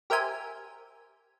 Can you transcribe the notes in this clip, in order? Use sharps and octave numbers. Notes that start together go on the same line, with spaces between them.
G4 A#4 C5 E5 G#5